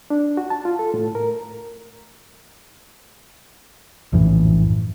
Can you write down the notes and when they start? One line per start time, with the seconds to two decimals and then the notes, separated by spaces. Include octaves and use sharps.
0.10 D4
0.37 F#4
0.50 A5
0.65 F4
0.79 A4
0.94 A2
1.15 A#4
4.12 A#1 F#2 A2 E3